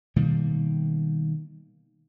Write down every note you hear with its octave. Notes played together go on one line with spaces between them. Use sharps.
B2 D#3 G3 A#3